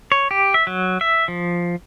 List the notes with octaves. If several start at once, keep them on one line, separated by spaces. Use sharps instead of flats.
C#5
G4
E5
F#3
E5
F3